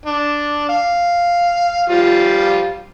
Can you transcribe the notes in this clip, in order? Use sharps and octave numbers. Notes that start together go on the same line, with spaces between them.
D4
F5
F3 G3 F4